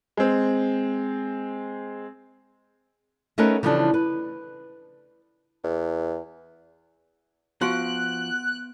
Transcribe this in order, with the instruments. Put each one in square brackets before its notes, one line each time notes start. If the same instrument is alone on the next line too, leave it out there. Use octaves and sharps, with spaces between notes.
[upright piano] G#3 C4
[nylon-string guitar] A3 C#4 D#4 F#4 A#4 B4
C#3 E3 F3 G3 D4 A4
B4
[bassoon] E2
[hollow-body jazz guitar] F3 [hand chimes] B3 C6 D7 [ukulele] F#4 [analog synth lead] F#6